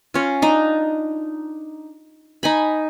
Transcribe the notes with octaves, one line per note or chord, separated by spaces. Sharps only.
C#4 F4
D4 D#4
D#4 G#5 B5